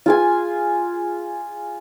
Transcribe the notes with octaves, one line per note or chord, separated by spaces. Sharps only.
F4 G#4 G#5